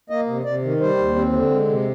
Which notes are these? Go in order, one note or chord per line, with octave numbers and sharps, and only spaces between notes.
A#3 D#5
C3
C3 D5
D#3
G3 C5
D#2
C4
D3
G#3
C3